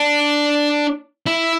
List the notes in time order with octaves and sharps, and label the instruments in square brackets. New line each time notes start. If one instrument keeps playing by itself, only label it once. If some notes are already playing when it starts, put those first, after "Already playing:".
Already playing: [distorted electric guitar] D4
E4